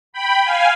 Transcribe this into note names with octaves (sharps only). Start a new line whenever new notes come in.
G5 B5
F5 G#5